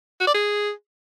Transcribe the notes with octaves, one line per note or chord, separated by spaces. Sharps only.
F#4
D5
G#4